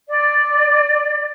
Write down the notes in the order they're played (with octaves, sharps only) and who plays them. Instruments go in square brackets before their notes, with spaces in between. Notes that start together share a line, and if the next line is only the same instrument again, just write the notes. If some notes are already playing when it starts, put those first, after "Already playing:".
[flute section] D5